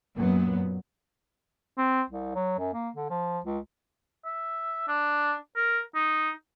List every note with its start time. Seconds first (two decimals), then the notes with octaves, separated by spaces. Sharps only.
0.16 F#2 A#2 F#3 B3
1.78 C4
2.10 C2
2.35 F#3
2.59 F#2
2.73 A#3
2.96 D3
3.10 F3
3.45 C#2
4.25 E5
4.88 D4
5.56 A#4
5.95 D#4